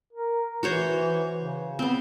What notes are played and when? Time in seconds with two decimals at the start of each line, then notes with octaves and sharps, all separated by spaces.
0.13 A#4
0.63 E3 F#4 C5 C#5
1.38 C#3
1.79 B3 C4